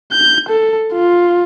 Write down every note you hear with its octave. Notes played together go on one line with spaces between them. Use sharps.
G6
A4
F4